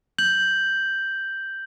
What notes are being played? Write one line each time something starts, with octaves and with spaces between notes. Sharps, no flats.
G6 F#7